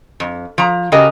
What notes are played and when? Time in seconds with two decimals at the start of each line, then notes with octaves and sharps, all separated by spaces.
0.20 F2
0.58 F3 A#5
0.92 C#3 F#4 G4 A#4 D#5